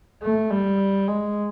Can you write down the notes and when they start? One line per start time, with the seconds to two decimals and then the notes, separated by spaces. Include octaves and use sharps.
0.22 A3
0.50 G3
1.07 G#3